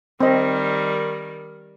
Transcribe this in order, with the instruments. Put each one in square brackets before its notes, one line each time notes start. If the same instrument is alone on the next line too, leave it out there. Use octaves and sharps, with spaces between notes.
[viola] D#3 G3 [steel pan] C4 D#5